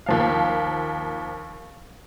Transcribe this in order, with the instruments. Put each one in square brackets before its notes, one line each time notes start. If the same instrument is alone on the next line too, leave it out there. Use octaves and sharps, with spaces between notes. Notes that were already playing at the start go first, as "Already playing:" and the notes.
[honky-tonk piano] D#2 F3 F5